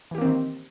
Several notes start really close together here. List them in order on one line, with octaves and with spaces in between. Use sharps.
E3 G4 A#3 C4 D#3